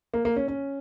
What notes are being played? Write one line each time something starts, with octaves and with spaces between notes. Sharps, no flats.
A#3
A#3
C#4
C#4